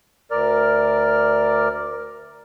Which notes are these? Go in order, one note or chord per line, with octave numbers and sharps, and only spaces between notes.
D2 A#4 D5 F6